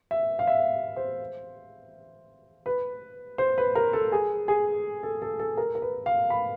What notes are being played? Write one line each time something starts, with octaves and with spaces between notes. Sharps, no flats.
E5
F5
E5
C5
B4
C5
B4
A#4
A4
G#4
G#4
A4
A4
A4
A#4
A#4
B4
F5
B5